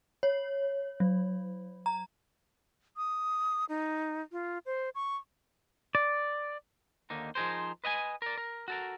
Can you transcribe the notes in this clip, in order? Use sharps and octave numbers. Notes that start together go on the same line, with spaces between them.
C#5
F#3
A#5
D#6
D#4
F4
C5
C#6
D5
D#2 D3 A#3 D#4
F3 D#4 G#4 A#4 C5
B4 D#5 F#5 G#5
A#4 D5
A#4
F#4 A4 A#4